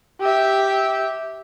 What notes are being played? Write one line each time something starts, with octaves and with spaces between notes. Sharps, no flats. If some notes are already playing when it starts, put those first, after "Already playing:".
G4 E5